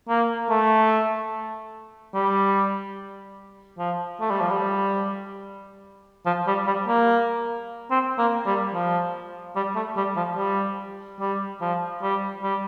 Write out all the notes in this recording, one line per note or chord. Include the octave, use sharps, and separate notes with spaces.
A#3
A3
G3
F3
A3
G3
F3
G3
F3
G3
G3
A#3
C4
A#3
G3
F3
G3
A3
G3
F3
G3
G3
F3
G3
G3